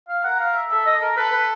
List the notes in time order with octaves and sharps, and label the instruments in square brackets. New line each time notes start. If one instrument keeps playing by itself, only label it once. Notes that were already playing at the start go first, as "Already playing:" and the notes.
[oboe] F5
[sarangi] A#4 [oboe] F#5
[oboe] F5
E5
[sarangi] A4 [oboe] E5
[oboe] D#5
A#4
[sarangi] A4 [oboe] B4
[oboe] B4